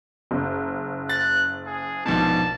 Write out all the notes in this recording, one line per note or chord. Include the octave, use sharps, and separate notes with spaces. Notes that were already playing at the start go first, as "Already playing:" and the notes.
F#1
F#6 A6
G#4
A#1 G#2 B2 A5